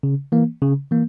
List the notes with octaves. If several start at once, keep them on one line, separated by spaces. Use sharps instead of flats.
C#3
E3 A#3
C#3
E3 A#3